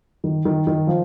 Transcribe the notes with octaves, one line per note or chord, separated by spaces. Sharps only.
D#3
D#3
D#3
F3